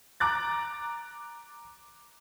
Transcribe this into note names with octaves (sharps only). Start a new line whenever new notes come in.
A#5 D6 F#6 A6